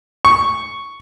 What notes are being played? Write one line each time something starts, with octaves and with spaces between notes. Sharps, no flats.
C#6